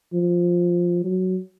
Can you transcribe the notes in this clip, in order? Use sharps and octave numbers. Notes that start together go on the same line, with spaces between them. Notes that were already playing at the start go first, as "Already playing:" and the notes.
F3
F#3